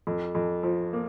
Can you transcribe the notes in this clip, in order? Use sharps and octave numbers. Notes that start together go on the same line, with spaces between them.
F2
F2
F3
A#3